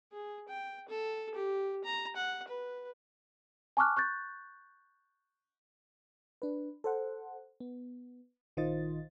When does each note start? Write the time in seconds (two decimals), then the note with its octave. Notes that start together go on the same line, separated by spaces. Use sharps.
0.12 G#4
0.49 G5
0.89 A4
1.35 G4
1.84 A#5
2.16 F#5
2.48 B4
3.77 G#5 A5 C#6 D6 F6 F#6
3.97 C#6 F#6 G6 A6
6.42 D4 B4
6.84 A4 C5 F#5
7.60 B3
8.57 A#1 D#3 F4 C5 D#5 A6